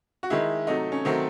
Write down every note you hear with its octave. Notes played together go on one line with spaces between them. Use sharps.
F#4
D#3 G#3 E4
C3 F#3 A3 D#4
C#4
D#3 F#3 A3 C4